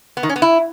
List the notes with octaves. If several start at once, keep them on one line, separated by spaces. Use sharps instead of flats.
B3
D#3
C#4
B3
E4